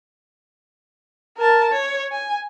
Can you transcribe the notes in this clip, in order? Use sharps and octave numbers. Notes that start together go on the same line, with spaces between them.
A#4 A5
C#5
G#5